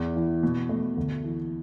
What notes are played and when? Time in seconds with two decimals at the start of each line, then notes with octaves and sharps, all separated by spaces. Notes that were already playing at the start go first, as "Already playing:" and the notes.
Already playing: E2
0.16 E3
0.43 B2
0.69 A3
0.97 D2
1.24 E3